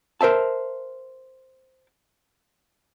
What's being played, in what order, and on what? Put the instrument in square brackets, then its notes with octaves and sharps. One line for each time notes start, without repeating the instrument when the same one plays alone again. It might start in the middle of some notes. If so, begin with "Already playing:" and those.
[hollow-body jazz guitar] A#4 C5 E5 A5